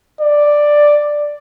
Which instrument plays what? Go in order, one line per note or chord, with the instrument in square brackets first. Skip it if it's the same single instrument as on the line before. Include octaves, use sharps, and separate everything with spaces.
[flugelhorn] D5